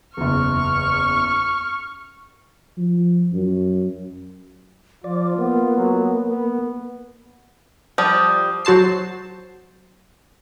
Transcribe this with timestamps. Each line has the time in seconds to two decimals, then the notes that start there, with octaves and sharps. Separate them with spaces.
0.17 F#1 E2 C#6 F6
2.77 F3
3.33 F#2
5.04 F3 F4 D5
5.38 A#3 B3
5.77 F#3
6.30 B3
7.98 F3 G3 D6 D#6 G6
8.65 F#3 F#4 C5 A5 C7